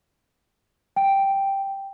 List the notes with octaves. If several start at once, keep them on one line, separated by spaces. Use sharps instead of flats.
G5